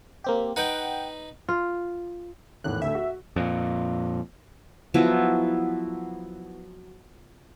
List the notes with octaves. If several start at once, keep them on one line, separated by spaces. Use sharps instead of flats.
A#3 C4 G4
D#4 B4 F#5 G5
F4
G#1 E2 A2 F#6
D2 A3 E5
F#4
F2 A#2
F3 F#3 B3 E4